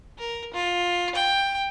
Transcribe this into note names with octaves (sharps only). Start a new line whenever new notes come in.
A#4
F4
G5